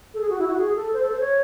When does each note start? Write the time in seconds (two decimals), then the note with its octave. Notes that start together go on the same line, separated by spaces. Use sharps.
0.14 A4
0.21 G#4
0.30 F#4
0.39 E4
0.47 F#4
0.57 G#4
0.76 A4
0.93 C5
1.03 A4
1.12 C5
1.20 C#5